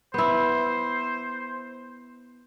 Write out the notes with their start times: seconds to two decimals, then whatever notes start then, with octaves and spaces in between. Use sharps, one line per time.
0.14 B3 E4 C5